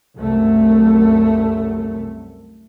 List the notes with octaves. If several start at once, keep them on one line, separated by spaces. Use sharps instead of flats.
C2 F#2 A3